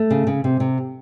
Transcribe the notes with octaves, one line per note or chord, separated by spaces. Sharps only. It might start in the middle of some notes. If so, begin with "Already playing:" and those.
Already playing: A3
C#3
C#3
C3
C3